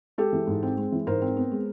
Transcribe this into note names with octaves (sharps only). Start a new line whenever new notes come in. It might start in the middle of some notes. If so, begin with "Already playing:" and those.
G#3 G4 A4
E3
G#2
C4
G#3
E3
G#2 A#4 C5
C4
B3
G#3